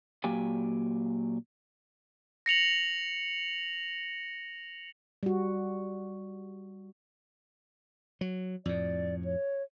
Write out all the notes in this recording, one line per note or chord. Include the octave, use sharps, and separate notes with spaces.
A#2 F#3 A#3 G4 G5 G#5
A#6 C#7 F7 F#7
G3 F#4
F#3
F2 A2 D5
C#5